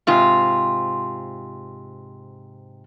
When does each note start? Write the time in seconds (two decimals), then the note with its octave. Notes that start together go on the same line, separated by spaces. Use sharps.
0.07 G#2 C3 F4